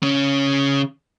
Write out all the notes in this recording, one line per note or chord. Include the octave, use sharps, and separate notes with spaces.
C#3 C#4